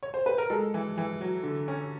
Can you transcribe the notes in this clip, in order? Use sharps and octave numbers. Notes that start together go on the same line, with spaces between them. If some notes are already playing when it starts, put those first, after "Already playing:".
C#5
C5
B4
A#4
G#3 A4
E3
E3
F#3
D3
C#4